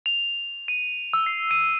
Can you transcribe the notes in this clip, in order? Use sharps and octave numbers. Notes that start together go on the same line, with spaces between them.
F7
D#7
E6
C7
D#7